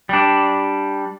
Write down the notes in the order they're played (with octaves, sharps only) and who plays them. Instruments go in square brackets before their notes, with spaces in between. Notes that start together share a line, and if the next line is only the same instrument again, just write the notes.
[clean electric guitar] G3 D4